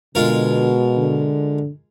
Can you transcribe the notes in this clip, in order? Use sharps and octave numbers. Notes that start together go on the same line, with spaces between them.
B2 D3 G#3 F4 A#4
D3